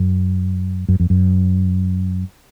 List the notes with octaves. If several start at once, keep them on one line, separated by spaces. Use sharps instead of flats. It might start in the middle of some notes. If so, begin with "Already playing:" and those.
Already playing: F#2
F#2
F2
F#2